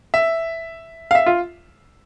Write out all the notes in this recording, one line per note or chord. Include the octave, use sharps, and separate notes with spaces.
E5
F5
E5
F4